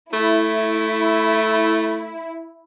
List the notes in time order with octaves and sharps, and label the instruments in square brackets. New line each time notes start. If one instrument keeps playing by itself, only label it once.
[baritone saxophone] A3 [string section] E4